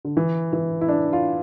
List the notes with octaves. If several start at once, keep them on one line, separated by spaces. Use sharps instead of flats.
D3
E3
E3
E4
D4
F4